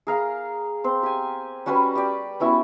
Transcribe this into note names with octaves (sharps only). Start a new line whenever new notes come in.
G#4 A#4 F5
C4 C5
G4 G#5
G3 C#4 F#4 B4
G4 D5
B3 C#4 E4 F#4